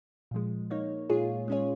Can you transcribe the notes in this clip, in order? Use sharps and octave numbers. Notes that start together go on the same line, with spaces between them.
A#2 F3 G#3
A#3 D#4 C#5
A#2 G#3 F4 G#4 C#5
G#3 C#4 F4 G#4 C#5